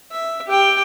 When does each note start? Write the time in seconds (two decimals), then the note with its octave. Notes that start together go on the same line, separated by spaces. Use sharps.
0.11 E5
0.47 G4 G5